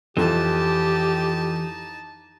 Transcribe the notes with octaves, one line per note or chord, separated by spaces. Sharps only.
F2 E3 D#4 G4 A5